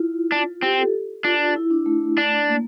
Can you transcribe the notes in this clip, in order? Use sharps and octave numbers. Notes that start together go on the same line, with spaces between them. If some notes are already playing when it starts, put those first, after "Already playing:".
Already playing: E4 F4
D4
C4 G4
A4
D4 F4
E4
D4
A3
D4
A#3